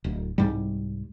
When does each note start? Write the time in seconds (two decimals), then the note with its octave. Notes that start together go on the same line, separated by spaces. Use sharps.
0.04 D1
0.38 C2 G#2 G3